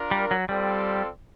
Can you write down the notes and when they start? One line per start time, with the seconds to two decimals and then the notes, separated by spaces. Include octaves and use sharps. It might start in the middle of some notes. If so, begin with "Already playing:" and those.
Already playing: D4 F4 A#4
0.11 G3
0.31 F#3
0.49 G3 C4 F4 A4 D5